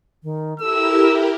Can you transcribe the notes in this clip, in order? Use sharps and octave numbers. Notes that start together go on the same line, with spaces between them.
D#3
E4 G4 A4 A#4 E6